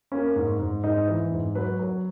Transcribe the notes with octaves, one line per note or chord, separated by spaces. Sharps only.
A#3 C#4
G#2
G#2
G#2 D#4
E3
G#2
F#3 B4
F#3